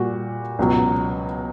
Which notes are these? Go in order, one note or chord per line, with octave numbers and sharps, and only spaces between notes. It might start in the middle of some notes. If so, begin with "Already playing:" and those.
Already playing: A#2 G3 F#4
C#2 B2 F#3